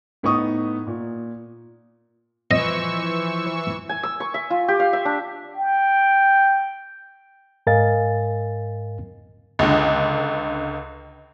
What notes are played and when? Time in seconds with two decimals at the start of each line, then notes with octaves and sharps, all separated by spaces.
0.23 A2 B3 D#4 C#6 D#6
0.87 A#2
2.51 E3 F3 C5 D#5 C#6 E6
3.89 G#5
4.03 E6
4.20 C#6
4.34 E5
4.50 F4
4.68 G4
4.80 F5
4.93 E5
5.05 D4
5.56 G5
7.67 G#2 A#4 D#5 F5 G#5 A6
9.59 C#2 D3